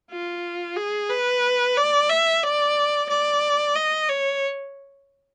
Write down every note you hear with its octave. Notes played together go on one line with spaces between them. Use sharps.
F4
G#4
B4
D5
E5
D5
D5
D#5
C#5